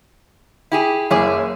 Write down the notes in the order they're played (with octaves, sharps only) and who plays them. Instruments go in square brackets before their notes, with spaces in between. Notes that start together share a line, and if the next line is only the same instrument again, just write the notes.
[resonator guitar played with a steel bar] E4 G4 G#4
[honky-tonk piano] F#1 C#5 D6 [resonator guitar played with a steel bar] E4 G#4